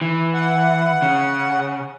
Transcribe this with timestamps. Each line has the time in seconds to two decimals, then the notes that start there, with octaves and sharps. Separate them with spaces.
0.01 E3
0.34 F#5
1.02 C#3